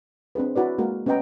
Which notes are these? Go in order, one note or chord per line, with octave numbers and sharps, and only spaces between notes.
C4 D4 G#4 B4
E4 F#4 B4 D5
G#3 A#3 F#4 A#4
B3 C#4 B4 D#5 G5 A#5